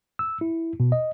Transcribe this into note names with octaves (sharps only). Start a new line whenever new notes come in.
E6
E4
B2
D#5